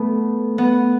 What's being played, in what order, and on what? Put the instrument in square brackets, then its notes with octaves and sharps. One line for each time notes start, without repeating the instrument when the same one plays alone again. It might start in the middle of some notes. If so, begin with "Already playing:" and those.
Already playing: [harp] A3 B3
B3